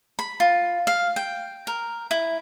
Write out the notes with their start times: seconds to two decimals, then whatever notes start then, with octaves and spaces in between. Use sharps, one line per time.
0.19 B5
0.40 F4
0.87 F5
1.16 G5
1.67 A#4
2.11 E4